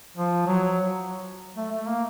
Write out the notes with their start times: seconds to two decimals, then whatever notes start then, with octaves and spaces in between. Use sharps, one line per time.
0.17 F3
0.47 F#3
1.57 A3
1.72 A3
1.87 A#3